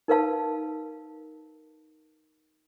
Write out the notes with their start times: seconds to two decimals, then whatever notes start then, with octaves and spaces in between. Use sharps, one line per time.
0.08 D#4 A#4 B4 F5 A5